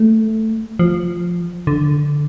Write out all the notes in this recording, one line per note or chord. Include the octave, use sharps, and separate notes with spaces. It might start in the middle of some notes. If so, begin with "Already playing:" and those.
Already playing: A3
F3
D3